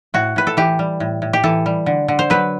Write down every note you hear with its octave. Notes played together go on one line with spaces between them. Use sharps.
A2 F#4
A2 B4
A4
E3 G4
G3
A2
A2
G4
E3 A4
G3
D3
D3
C5
F#3 B4